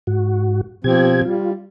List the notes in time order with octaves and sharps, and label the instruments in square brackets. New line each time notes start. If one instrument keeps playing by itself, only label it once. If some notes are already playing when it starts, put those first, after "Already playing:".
[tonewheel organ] G#2 F#4
[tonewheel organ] B2 G4 G#6 [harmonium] F3 C4
[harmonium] G3 [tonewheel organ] F4